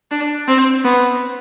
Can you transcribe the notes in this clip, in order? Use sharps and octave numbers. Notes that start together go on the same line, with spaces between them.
D4
C4
B3